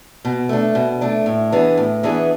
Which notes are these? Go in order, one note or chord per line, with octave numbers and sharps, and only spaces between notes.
B2
A3 D4
B2
A3 D4
A2
E3 B3 D4 G#4
A2
E3 B3 D4 G#4